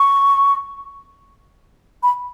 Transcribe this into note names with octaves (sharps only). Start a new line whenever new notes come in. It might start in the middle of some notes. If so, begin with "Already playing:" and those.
Already playing: C#6
B5